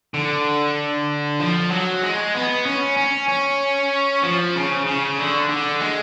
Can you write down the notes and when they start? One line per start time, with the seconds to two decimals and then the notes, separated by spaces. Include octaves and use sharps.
0.14 D3
1.40 F3
1.72 F#3
2.02 G#3
2.35 B3
2.66 C#4
2.98 C#4
3.29 C#4
4.23 F3
4.56 C#3
4.86 C#3
5.19 D3
5.50 D3
5.81 G#3